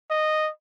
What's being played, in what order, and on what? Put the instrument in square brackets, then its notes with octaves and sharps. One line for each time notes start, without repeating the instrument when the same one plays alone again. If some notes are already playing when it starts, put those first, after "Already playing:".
[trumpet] D#5